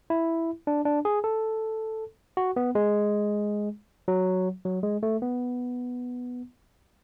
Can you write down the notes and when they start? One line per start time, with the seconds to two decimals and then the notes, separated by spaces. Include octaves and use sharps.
0.10 E4
0.67 D4
0.85 D4
1.05 G#4
1.24 A4
2.37 F#4
2.56 B3
2.75 G#3
4.08 F#3
4.65 F#3
4.83 G#3
5.03 A3
5.22 B3